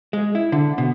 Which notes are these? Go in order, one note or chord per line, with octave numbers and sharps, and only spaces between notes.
G#3
E4
D3
B2